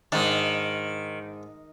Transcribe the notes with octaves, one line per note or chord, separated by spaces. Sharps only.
G#2 D#3 D4